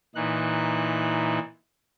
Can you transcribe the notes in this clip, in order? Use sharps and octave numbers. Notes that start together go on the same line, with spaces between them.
A#2 E3 D#4 F#6